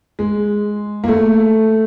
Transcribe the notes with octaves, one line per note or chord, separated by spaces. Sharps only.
G#3
A#3
A3